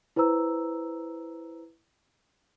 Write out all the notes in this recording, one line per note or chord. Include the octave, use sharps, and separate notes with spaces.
E4 B4 C5 A#5 E6